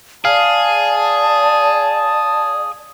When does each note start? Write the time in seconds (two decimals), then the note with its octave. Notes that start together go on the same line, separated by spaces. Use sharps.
0.25 G#4 D5 F5 A5